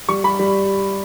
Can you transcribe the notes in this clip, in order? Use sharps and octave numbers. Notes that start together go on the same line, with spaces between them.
G3 C#6
G3 B5
G3